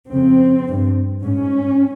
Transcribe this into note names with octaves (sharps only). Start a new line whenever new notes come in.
F2 C#3 C4
G2
G#2 C#4